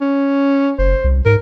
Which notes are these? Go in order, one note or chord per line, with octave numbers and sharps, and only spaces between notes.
C#4
F#1 C5
C2
G#2 A#4